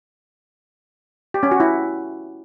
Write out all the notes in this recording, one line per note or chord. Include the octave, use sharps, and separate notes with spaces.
G4
C#4
F#4
E4